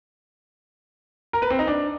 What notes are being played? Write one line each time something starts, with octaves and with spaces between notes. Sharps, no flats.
A#4
B4
C4
D#4
D4